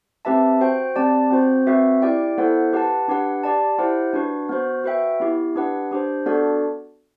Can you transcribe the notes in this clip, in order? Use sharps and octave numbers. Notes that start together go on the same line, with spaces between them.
C4 G4 B4 E5 A5
F#4 C5 G5
C4 G4 D5 A5
C4 F#4 C5
C4 F#4 B4 E5
E4 G4 D5 G5
B3 E4 A4 C5 F#5
G4 B4 F#5 A5
D4 G4 B4 F#5
G4 D5 A5
E4 G4 C5 F#5
D4 F#4 B4
B3 F#4 C5
F#4 B4 E5 G5
B3 E4 G4
D4 G4 B4 F#5
D4 G4 C5
B3 D4 F#4 A4 D5